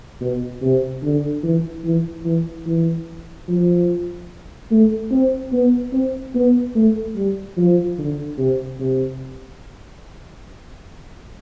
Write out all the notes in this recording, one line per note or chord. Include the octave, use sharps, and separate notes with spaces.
B2
C3
D3
E3
E3
E3
E3
F3
A3
C4
B3
C4
B3
A3
G3
F3
D3
C3
C3